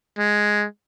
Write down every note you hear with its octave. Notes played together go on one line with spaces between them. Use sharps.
G#3